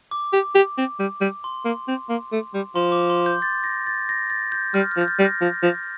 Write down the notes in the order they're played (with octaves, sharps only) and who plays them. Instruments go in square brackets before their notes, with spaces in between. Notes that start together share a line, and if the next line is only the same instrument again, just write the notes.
[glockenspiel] D6
[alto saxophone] G4
G4
C4
G3
G3
[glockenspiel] C6
[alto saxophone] A#3
C4
A#3
A3
G3
[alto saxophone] F3 [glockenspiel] C6
[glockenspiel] D6
C6
G6
A6
A#6
A6
A#6
A6
G6
[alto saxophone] G3 [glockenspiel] F6
[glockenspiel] F6
[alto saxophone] F3
[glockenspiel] G6
A6
[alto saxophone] G3
[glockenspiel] A#6
[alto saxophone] F3
F3